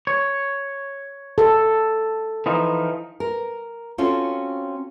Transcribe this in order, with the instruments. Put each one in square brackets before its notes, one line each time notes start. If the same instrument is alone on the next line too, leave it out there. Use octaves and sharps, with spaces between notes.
[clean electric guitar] C#5
[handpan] A4
[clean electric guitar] E3 F3 D#4
[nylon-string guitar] A#4
C4 C#4 F4 F#4 A4